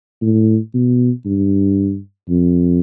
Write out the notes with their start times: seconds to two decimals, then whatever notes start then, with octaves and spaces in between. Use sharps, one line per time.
0.22 A2
0.74 B2
1.26 G2
2.29 F2